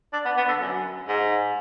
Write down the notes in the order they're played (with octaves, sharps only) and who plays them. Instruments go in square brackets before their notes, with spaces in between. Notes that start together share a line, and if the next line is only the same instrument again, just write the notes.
[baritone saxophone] D4
B3
B3
D3
F#2
G#2